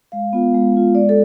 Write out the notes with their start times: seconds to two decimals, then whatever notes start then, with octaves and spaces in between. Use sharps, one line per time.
0.12 G#3 F5
0.33 B3 F4
0.54 G#3
0.75 B3 F4
0.95 G#3 D5
1.09 A4